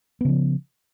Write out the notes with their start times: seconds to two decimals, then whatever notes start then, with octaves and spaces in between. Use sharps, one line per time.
0.21 B3
0.25 C#3
0.29 F3